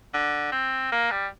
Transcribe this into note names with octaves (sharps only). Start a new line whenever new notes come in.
D3
C4
A#3
G3